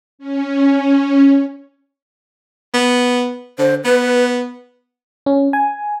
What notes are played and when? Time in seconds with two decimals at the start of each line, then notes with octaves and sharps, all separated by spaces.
0.19 C#4
2.74 B3
3.59 D3 C5
3.85 B3 B4
5.26 C#4
5.53 G#5